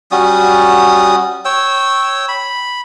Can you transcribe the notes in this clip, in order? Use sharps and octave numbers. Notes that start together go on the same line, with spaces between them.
G3 C#4 F#4 D#6
C#5 G5 E6
B5